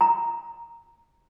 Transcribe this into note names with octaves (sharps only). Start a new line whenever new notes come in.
A#5